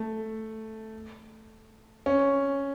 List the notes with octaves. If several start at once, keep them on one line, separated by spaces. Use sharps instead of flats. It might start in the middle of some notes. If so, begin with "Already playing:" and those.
Already playing: A3
C#4